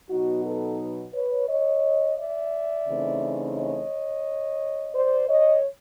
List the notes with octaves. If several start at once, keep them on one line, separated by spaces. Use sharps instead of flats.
B2 F#3 B3 D#4 F#4
A4 B4
B4 C#5
C#5 D#5
D5 E5
C#3 E3 A3 C4 D#4
C#5 D#5
C5 D5
C#5 D#5